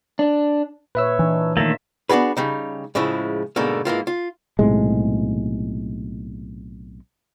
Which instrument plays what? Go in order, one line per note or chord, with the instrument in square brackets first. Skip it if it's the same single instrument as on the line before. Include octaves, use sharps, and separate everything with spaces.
[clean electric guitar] D4
[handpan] A#2 C#5 [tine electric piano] B4 E5 E6
[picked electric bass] E3 [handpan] D4 D#4
[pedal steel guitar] D#3 A3 A#3 [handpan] F4 E5 [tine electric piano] E6 A6 A#6
[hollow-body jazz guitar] B3 D4 F#4 G#4 B4
C#3 G3 D#4
A2 C#3 F3 G#3 E4
G#2 B2 D3 A3 A#3
G#2 E3 A#3 F4
F4
[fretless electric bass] B1 A2 C3 G#3